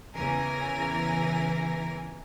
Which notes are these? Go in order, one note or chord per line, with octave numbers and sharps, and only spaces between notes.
E2 C#3 E3 A#4 G#5 A#6